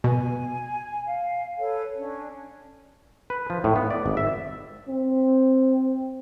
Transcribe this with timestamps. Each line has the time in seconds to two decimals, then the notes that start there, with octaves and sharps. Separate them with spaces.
0.04 B2 G#5
1.05 F5
1.59 A4 B4 C#5
1.95 C#4 D4
3.30 B4
3.50 F3
3.64 A2
3.76 B3
3.90 D5
4.06 G#1
4.17 E5
4.88 C4